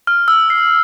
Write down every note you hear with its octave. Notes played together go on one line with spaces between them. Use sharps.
F6
E6
C7